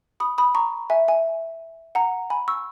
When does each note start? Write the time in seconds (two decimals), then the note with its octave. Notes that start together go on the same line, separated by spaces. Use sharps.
0.20 B5 D#6
0.38 B5 D#6
0.55 A#5 C#6
0.90 E5 G#5
1.08 E5 G#5
1.95 F#5 A#5
2.30 G#5 B5
2.48 C#6 E6